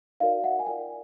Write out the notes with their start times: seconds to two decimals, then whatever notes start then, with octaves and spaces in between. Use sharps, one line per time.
0.20 D#4 F#4 A#4 D5 D#5 F5
0.43 E5 F#5
0.59 G#5
0.66 F4 A#4 D5 F5 G5